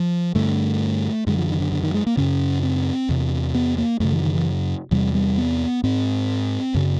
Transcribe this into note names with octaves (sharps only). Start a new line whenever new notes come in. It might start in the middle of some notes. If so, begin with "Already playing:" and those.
Already playing: F3
G2 D3 A3
F#2 D3 G#3
F3
D#3
D3
D3
D#3
G#3
A#3
F#2 C#3 C#4
C4
E2 C3
B3
A#3
F#2 C#3 A3
E3
D#3
E3
E2 C3 G3
G3
B3
G#2 C4
F#2 C#3